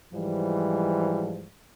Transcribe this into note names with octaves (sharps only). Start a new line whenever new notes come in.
G#2 E3 F3 G3